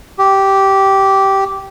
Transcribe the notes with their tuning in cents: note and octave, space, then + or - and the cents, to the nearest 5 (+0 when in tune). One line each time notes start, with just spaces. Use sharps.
G4 -10